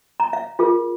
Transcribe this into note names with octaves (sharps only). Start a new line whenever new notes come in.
A#5
F5
F4 G#4 A#4